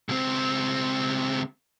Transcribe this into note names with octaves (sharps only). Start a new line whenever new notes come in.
C#2 C4